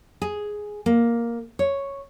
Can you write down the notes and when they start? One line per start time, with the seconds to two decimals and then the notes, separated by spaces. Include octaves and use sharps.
0.22 G#4
0.86 A#3
1.59 C#5